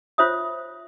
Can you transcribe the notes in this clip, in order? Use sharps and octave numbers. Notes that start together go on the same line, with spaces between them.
F4 C5 C#5 E5 D#6